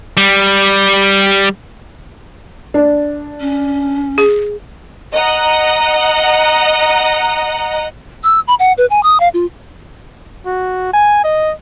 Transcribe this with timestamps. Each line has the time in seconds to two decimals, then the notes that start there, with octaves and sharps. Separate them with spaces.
0.17 G3
2.74 D4
3.40 C#4
4.18 G#4
5.14 D#5 F#5 A#5
8.24 E6
8.47 B5
8.59 F#5
8.78 B4
8.90 G#5
9.03 D#6
9.20 F5
9.34 F4
10.46 F#4
10.93 G#5
11.24 D#5